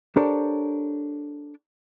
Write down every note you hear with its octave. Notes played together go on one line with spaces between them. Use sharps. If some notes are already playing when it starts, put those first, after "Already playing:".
D4 G4 A4 A#4 C5 C#5